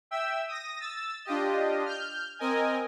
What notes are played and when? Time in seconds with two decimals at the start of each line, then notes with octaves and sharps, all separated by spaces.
0.11 E5 G5 E6
0.48 D#6 A#6
0.80 E6 A6
1.25 D4 F4 G4 D#5
1.86 F6 G6
2.39 C4 A#4 D#5 G#5